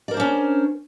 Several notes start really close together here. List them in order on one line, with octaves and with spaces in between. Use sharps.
D5 A#4 C5 D4 C#4